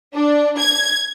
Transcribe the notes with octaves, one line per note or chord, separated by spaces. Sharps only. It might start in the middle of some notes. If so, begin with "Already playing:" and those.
D4
G#6